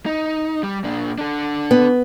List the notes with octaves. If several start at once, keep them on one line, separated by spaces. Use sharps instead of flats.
D#4
G3
A#2 D4
D4 A4
B3